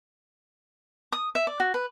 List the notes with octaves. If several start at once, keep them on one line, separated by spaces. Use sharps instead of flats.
D#6
E5
D5
F#4
B4